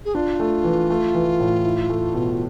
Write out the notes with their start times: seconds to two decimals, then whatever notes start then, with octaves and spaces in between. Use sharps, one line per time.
0.05 G#4
0.15 D4 F4
0.40 A3
0.64 E3
0.90 A3
1.15 E3
1.40 A2
1.64 E4
1.90 A3
2.14 B2